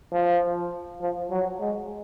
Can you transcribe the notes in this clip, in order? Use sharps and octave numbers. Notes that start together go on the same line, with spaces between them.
F3
F3
F#3
G#3